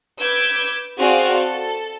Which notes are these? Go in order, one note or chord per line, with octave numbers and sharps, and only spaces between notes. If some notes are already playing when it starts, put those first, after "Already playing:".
B4 D6 E6 G6 G#6
C4 F#4 G#4 D5 F5
A4